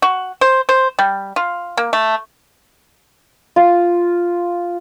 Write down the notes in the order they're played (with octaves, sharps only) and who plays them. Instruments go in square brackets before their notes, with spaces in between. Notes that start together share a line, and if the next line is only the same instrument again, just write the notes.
[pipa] F#4
C5
C5
G3
F4
A#3
A3
[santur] F4